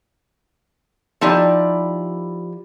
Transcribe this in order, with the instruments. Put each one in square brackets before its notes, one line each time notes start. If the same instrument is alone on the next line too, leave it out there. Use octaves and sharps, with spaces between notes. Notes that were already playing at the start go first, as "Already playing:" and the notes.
[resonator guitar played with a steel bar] F3 D#4 E4 G4 D5